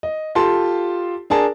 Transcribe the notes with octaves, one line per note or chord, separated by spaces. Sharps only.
D#5
F4 G4 A4 A5 C6
D4 G#4 A#4 A5